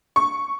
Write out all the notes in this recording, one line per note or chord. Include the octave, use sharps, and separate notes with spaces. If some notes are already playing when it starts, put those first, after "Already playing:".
C#6